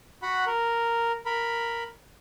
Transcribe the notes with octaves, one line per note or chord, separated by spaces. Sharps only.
F#4 F#5 B5
A#4
A#4 B5